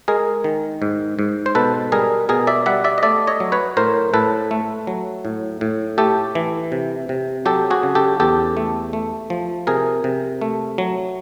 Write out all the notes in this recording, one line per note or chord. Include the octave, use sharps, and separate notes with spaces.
G#3 G#4 A#4
D#3
G#2
G#2
C5
B2 A4 B4
G3 G#4 A#4
B2 G#4 A#4
D5 E5
G3 E5 F#5
D5 E5
D#5
A3 D5 E5
C#5 D#5
F#3
B4 C#5
A2 A#4 C5
A2 A4 B4
A3
F#3
A2
A2
A3 G4 A4
E3
C3
C3
F#3 G4 A4
F#4 G#4
C#3
G4 A4
E2 G4 A4
A3
A3
F3
C3 G#4 A#4
C3
A3
F#3